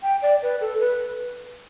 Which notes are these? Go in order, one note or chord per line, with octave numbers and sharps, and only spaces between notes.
G5
D5
B4
A4
B4